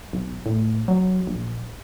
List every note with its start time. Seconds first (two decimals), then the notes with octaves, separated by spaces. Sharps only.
0.13 B1
0.46 A2
0.88 F#3
1.27 A#1